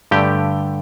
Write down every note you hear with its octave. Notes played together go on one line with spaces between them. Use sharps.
G2 D3 A3 G4 G5